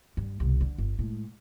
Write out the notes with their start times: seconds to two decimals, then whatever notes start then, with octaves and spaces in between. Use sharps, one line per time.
0.17 G2
0.40 C2 B2
0.61 D3
0.78 G1
0.99 A2 G#3